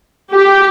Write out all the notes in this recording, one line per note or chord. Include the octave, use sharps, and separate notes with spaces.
G4